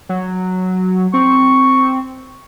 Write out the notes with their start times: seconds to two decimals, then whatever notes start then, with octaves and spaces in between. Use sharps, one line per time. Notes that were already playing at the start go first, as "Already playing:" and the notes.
0.09 F#3
1.14 C4 C#6